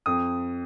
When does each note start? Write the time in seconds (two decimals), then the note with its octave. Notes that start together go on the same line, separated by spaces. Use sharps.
0.06 F2 D#6